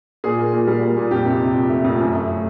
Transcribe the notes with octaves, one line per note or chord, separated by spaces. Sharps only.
A#2 G#4
A#3
A#2
G3
A#3
A#2
F2 G4
C3
C3
F2
A3
F2
F#2
A3